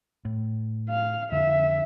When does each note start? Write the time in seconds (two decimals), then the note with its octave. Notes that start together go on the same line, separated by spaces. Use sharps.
0.25 A2
0.90 F5
1.32 F2 D3 E5